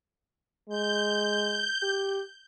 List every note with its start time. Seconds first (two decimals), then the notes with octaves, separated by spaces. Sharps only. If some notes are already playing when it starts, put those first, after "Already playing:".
0.69 G#3 G6
1.82 G4